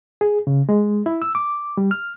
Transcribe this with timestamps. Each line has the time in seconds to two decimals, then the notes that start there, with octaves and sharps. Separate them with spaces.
0.21 G#4
0.47 C#3
0.69 G#3
1.06 E4
1.22 E6
1.35 D6
1.77 G3
1.91 F6